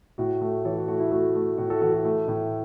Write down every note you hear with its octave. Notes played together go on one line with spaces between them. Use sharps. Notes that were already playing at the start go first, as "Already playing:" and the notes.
A2 F#4
A3
E3 A4 C#5
F#4
A3 F#4
E4
A3 F#4
A3
A2 F#4
F#4 A4
E3 F#4 A4
F#4
A3
A2